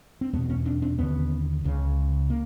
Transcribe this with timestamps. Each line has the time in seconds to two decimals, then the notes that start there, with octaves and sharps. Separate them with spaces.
0.21 C4
0.33 E2 A3 B3
0.38 B2
0.50 B3 C#4
0.65 C4 D4
0.82 C4 D4
0.98 D#2 D3 B3 C#4
1.64 C#2 C#3
2.30 A#3